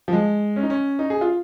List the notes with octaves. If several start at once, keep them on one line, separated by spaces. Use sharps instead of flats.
F3
G#3
C#4
D#4
C#4
D#4
G#4
F4